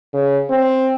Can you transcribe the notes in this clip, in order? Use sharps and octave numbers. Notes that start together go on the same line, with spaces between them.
C#3
C4